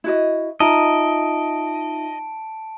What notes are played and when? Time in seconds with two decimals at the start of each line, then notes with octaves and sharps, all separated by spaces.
0.04 E4 F#4 D#5
0.60 D#4 F4 D#5 E5 A5 A#5 D7